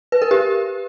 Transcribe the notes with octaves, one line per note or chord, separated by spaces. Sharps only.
B4
A#4
G4